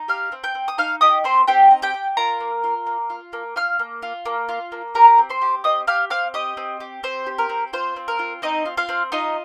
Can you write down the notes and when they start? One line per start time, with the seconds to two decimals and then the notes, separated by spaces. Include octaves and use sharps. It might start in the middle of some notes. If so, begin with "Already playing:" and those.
Already playing: D#4
0.08 G4 F5 F6
0.32 C4
0.44 G5 G6
0.55 C4
0.68 D#6
0.78 D#4 F5 F6
1.01 G4 D#5 D#6
1.24 C4 C5 C6
1.47 C4 G4 G5
1.71 D#4
1.82 G4 G5
1.94 G4
2.17 F4 A#4 A#5
2.40 A#3
2.64 F4
2.87 A#3
3.10 F4
3.33 A#3
3.56 F4 F5 F6
3.79 A#3
4.02 F4
4.26 A#3
4.49 F4
4.72 A#3
4.95 G4 A#4 A#5
5.18 C4
5.30 C5 C6
5.42 G4
5.64 C4 D#5 D#6
5.87 G4 F5 F6
6.10 C4 F5 F6
6.34 G4 D#5 D#6
6.57 C4
6.80 G4
7.03 C4 C5
7.27 G4
7.38 A#4
7.49 C4
7.73 F4 C5
7.96 C4
8.08 A#4
8.19 F4
8.42 C4 D#4 D#5
8.65 F4
8.77 F4 F5
8.89 C4
9.12 D#4 F4 D#5